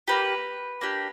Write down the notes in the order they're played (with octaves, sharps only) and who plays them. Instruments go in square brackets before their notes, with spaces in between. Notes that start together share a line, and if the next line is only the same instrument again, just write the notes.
[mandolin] A#3 D4 G4 B4
A#3 D4 G4